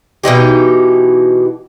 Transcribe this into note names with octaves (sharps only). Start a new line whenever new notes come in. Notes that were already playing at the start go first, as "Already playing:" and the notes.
B2 E3 D#4 G4